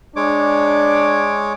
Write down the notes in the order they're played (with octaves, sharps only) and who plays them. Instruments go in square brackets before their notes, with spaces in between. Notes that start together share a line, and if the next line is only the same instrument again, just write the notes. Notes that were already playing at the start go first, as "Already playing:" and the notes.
[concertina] G#3 C#5 D6 [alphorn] D4